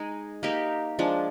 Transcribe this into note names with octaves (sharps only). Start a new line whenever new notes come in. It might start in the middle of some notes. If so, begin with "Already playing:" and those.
Already playing: G#3 D#4 G#4
A#3 D#4 G4 A#4
F3 G#3 D4